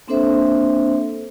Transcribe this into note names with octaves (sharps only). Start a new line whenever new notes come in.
A#3 C4 D4 A4 C5 E5